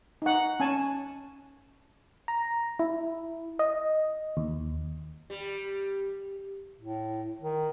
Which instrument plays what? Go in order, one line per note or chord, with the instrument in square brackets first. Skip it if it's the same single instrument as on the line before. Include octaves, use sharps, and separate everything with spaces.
[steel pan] D#4 F#5
C#4 G#5 A5
[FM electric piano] A#5
E4
D#5
D#2
[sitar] G3
[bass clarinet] A2
D#3